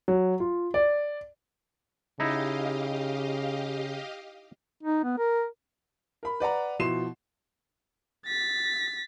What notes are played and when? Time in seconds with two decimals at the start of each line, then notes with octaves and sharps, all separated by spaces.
0.08 F#3
0.40 F4
0.74 D5
2.20 C#3 D#4 E4 G4 D#5 F5
4.83 D#4
5.04 B3
5.18 A#4
6.23 A#4 B5
6.40 B4 D5 F#5 A#5
6.79 B2 F3 E4 C6 C7 E7
8.26 A6 B6